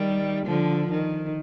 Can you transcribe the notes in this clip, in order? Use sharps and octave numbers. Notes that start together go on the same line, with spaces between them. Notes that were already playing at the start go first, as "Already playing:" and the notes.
Already playing: D#3 G3
D3 F3
D#3